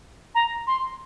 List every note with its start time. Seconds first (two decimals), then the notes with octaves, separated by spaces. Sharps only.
0.35 A#5
0.67 C6